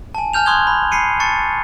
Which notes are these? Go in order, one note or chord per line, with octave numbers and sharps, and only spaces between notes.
G#5 A5
G#5 A5 F6 G6 F7
C6 C#6 D#6 F#6 G#6 G7
B5
B5 C7 C#7 D#7
A5 C#6 A6 C#7